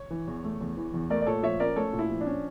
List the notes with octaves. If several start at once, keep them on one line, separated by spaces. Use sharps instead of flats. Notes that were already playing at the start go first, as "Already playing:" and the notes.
Already playing: C#5
E3
E2
A3
E2
E3
E2
A3 A#4 D5
D5
A#2 A4 C#5
F3 C#5 E5
C#4 A#4 D5
A3 A4 C#5
A#2
E4
F3
D4
C#4